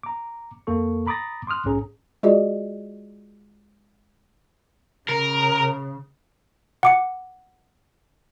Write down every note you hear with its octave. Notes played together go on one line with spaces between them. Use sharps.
A#5 D6
F2 A#3 A4 C#6
A#5 B5 D6 D#6 A6 A#6
C6 D6 D#6 F6 F#6
B1 G#2 C#4 G#4 A#5
G#3 F4 F#4 G#4 D5 D#5
C#3 A#4
F#5 D6 C#7